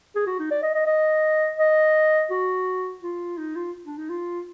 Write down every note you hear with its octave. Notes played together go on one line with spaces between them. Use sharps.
G#4
F#4
D#4
D5
D#5
D#5
D#5
D#5
F#4
F4
D#4
F4
D4
D#4
F4